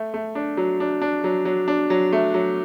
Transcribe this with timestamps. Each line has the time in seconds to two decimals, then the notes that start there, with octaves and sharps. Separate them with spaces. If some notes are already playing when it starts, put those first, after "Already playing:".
Already playing: A3
0.14 A3
0.35 D4
0.57 F#3
0.80 D4
1.02 D4
1.24 F#3
1.45 F#3
1.68 D4
1.90 F#3
2.13 A3
2.34 F#3